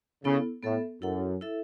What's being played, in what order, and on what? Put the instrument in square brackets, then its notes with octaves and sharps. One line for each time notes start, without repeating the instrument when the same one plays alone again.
[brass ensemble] C#3 [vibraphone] B3 E4 A4
[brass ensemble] A2 [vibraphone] B3 A4 E5
[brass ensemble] F#2 [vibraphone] E4 A4 F#5
[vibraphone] E4 A4 E5